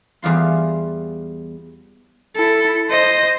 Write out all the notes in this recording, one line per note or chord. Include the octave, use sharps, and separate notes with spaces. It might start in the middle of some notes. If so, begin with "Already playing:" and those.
E2 G3 F4 C6
E4 A4
C5 D#5